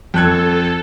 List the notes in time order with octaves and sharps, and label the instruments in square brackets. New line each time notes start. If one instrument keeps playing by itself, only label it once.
[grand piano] F2 F#6 G#6 [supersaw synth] A4